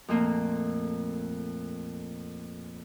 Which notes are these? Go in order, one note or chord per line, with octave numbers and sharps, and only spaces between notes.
F2 A#2 A3 A#3